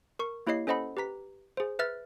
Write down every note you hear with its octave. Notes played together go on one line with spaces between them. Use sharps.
A#4 C#6
A#3 E4 G4 C#5 D#5 C7
C#4 A4 C5 D#5 F#5 B5
G4 B4 A#5 B6
G#4 C5
B4 E5 F6 A6